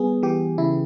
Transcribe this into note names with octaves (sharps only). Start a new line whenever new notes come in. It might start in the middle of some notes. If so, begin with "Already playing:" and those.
Already playing: G3 B3 G#4
E3 G4
C#3 E4